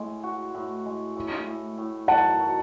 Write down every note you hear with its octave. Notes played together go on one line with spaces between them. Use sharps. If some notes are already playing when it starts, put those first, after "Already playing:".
Already playing: A2 G#3
F#4
A2
G#3
A2
A2
A2
F#3 F#5 A5
F#3